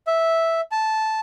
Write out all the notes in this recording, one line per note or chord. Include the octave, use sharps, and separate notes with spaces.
E5
A5